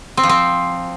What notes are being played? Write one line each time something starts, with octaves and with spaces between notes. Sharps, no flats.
C4
F3
C4